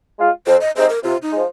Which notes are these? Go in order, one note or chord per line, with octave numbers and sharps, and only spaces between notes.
G#3 F4
F2 C5
D#5
C3 G#3 D#4 C5
A#4
C3 F4
D#4
F3 G#3